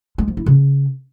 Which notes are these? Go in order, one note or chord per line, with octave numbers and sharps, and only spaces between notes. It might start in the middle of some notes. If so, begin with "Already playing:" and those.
G#3
F3
E4
C#3